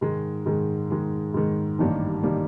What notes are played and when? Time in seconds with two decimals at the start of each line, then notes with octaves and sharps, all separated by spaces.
0.01 G#2 D#3 G#3
0.46 G#2 D#3 G#3
0.90 G#2 D#3 G#3
1.34 G#2 D#3 G#3
1.79 A1 G2 D#3 G3 A#3
2.23 D#3 G3 A#3